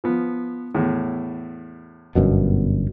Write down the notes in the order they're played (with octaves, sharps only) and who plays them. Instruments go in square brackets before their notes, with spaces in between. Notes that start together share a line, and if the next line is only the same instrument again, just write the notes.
[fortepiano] F3 B3
E2 A2
[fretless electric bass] G1 F#2 B2